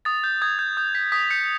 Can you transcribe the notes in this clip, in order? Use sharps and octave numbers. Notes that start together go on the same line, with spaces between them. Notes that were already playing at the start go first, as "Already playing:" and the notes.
D#6 A6
G6
D#6 G#6
G6
D#6 G6
G6 B6
D#6 B6
G6 C#7